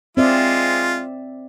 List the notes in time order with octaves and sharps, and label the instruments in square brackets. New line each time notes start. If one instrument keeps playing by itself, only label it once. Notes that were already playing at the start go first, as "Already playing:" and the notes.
[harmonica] G#3 F4 [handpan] C4 D5 E5